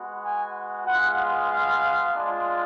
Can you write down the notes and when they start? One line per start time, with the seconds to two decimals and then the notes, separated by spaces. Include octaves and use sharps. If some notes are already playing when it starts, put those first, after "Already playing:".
Already playing: G#3 B3 F#4
0.24 G#5
0.87 G#3 B3 F4 F#5
1.49 F5
2.13 G#3 D4 F4